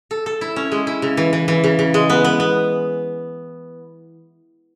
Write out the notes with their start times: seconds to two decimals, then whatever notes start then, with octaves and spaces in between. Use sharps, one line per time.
0.11 A4
0.26 A4
0.41 E4
0.56 C#4
0.72 G#3
0.87 E4
1.02 C#3
1.17 E3
1.33 E3
1.48 E3
1.64 C#3
1.79 C#3
1.94 G#3
2.10 B3
2.25 B3
2.40 B3